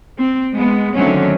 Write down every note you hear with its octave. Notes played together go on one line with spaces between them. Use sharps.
C4
G#3 B3
D3 D#3 F#3 A3 C4 C#4